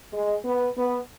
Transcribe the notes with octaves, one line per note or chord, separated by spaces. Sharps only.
G#3
B3
B3